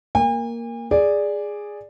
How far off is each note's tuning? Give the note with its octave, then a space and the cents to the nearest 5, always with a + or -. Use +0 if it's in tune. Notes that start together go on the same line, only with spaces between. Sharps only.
A#3 +0 G#5 -45
G#4 -5 D5 +0